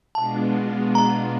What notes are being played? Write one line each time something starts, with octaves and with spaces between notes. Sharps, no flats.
B2 G#3 B3 D4 F4 A5
A#5